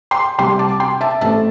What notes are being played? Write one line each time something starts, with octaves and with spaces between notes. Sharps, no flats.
G5 C6
C2 C3 G3 G5 C6
A5 D6
G5 C6
E5 A5
A1 A2 A3 C4 E5 A5